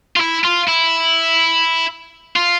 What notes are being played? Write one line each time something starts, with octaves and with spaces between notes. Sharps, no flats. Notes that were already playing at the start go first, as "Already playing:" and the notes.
F4
E4
F4
E4
F4